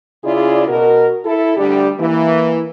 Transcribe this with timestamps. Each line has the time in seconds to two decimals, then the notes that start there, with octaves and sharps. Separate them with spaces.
0.24 C#3 E4 F4 G#4 D5
0.68 B2 F#4 A#4
1.25 E4 A4
1.57 D2 G3 D4 G4
1.99 E3 A#3